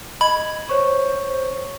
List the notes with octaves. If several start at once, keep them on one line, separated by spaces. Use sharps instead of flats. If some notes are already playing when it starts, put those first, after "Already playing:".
D#5 B5 G#6
C5 C#5 C#6